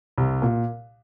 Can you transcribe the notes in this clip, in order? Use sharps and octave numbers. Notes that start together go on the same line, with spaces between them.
C2
A#2